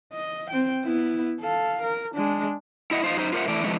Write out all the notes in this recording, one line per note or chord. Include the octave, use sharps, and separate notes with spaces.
D#5
C4 G5
B3 E4
A4 F5
A#4
G#3 D4
E4 D#5 E5 F#5
D#4 F4 C5
F#2 D#4 C5
F4 A#4 C5 D5 E5 F#5
E3 A3 D5
C3 E3 F3 G#3 A3 C#4